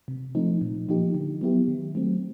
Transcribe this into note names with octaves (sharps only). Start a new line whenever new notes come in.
C3
F3 A3 C4 D#4
A#2
F3 A#3 D#4 G4
D3
F#3 B3 E4 G4
D#3
F#3 A3 C4